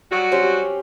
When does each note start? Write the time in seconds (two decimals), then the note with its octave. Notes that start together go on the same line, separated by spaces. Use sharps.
0.12 F#3 G3 F#4
0.32 C4 C#4 G4